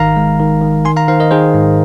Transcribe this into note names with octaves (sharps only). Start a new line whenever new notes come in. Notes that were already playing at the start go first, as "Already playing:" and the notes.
Already playing: G#1 D#3 F5 A#5
G#3
D#3
D#3
D#3 G#5 C6
F5 A#5
D#3 C5 F5
A#4 D#5
D#3 G#4 C5
G#2